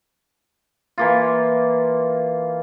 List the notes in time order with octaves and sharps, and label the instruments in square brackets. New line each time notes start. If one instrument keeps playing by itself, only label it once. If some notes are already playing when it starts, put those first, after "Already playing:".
[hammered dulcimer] E3 A#3 F4